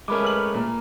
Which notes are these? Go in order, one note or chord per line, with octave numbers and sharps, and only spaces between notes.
G#3 A3 C#4 A#4 B5 D6
B4 F6 F#7
A#2